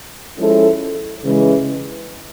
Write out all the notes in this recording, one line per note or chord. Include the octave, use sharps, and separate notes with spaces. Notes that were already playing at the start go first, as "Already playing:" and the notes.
F3 G#3 C#4 E4 A4
C#3 E3 G#3